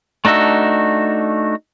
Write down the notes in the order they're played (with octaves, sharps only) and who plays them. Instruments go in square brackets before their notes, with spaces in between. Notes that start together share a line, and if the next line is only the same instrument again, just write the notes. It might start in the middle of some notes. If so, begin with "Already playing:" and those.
[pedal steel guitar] A3 D4 D#4 F#4 E5